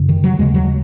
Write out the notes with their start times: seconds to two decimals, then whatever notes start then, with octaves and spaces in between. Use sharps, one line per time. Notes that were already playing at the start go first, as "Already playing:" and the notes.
Already playing: F#2 C#3
0.09 D#3
0.24 F#3
0.39 D#2 C#3 G#3
0.54 F#3